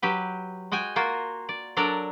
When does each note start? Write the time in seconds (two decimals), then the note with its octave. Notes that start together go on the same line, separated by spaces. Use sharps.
0.02 F#3 G4 B4
0.72 G#3 F#4 G5 G#5
0.96 A#3 F4 F#4 A#4
1.49 D5
1.77 F#3 D4 A4 A#4 D5 A#5